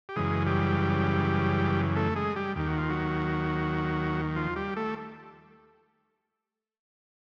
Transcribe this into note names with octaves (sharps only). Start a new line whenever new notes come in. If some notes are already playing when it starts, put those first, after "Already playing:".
G4
F#2 C#3 E3 G#3 G#4
G3 G4
A3 A4
G#3 G#4
G3 G4
D#2 D#3 G4
F#4
F4
F#3 F#4
F3 F4
G3 G4
A3 A4